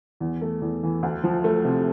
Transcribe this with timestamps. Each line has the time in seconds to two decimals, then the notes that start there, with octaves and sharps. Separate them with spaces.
0.20 E2
0.41 A3
0.62 E2
0.83 E3
1.03 D2
1.24 F3
1.44 A3
1.65 C3